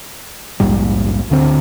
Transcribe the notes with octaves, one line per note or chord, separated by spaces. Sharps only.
A#1 D#2 G#2 G3
D2 D3 C4